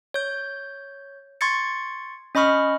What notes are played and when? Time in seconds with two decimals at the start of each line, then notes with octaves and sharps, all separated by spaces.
0.14 C#5 G6
1.41 C6 C#6 G#6 A6 C#7
2.35 C#4 D#5 B5 C#6 F6